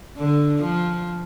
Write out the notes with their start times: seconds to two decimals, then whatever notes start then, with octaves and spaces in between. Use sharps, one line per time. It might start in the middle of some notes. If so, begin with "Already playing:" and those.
0.17 D3
0.62 F3